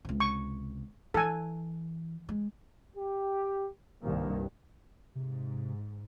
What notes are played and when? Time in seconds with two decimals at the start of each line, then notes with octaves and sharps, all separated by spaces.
0.05 C#2 C3
0.20 C#6
1.14 E3 A4 G#5
2.29 G#3
2.96 G4
4.03 C2 G2 C3 D#3 A#3
5.15 G#2 C3